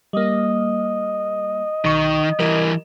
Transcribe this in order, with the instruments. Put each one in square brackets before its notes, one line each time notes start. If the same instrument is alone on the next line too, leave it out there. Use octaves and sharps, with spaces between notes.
[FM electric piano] G3 A#3 [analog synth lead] D#5
[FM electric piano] B1 C#6 [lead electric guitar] D#3
[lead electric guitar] E3 G3 [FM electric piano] A#4